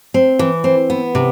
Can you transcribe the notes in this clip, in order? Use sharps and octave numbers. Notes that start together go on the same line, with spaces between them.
C4
E3
C4
B3
C3